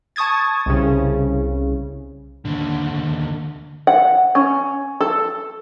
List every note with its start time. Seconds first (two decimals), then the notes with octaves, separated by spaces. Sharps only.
0.16 A5 C#6 D#6 G#6 A6
0.66 C2 C#3
2.45 D#2 D3
3.87 F#5
4.35 C#4
5.01 A4